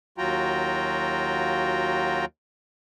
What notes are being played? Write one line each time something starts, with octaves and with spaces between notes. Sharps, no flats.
D#2 F#3 F4 F#4 G5 A#5